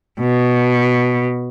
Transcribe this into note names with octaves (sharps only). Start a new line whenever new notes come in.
B2